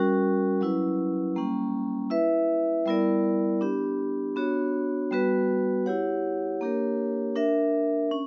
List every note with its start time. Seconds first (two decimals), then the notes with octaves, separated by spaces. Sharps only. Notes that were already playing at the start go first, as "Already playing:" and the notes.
Already playing: G3 C#4 F#4 A#4
0.61 F#3 C#4 E4 B4
1.36 G3 A#3 C#4
2.10 E4 B4 E5
2.86 G3 B3 E4 A#4 D5
3.61 B3 D4 G4
4.36 B3 D4 F#4 C#5
5.11 G3 B3 F#4 B4
5.86 E4 G4 C#5 F#5
6.61 A#3 D4 G4 A#4 C#5
7.36 D4 A#4 E5
8.11 C#4